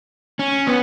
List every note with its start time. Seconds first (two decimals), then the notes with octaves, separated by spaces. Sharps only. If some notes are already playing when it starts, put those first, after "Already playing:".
0.39 C#4
0.67 B3